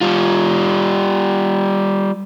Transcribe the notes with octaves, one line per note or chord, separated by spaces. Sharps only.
G3 F4